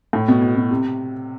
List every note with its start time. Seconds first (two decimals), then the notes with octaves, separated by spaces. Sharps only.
0.13 A2
0.28 B2
0.42 B2
0.56 B2
0.71 C3